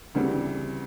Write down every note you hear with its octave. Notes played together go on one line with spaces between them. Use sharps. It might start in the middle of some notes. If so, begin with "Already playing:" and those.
D2 C#3 E3 G3 C4